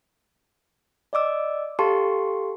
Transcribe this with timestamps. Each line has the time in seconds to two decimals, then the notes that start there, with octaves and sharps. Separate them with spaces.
1.13 D5 D#5 D6 E6
1.79 G4 A4 F5 A5 C6 C#6